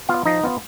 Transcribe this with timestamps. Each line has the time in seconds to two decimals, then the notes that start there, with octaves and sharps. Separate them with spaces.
0.09 B3 F4 F5
0.26 F3 D#4 D#5
0.44 B3 F4